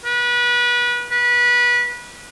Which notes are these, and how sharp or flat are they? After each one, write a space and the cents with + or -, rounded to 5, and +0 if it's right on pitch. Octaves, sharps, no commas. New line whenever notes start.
B4 -30
B4 -25